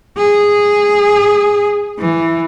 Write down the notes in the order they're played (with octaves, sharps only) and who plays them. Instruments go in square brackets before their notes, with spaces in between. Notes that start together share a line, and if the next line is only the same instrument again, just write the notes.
[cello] G#4
E3